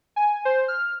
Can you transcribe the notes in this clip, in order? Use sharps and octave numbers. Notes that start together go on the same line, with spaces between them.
G#5
C5
F6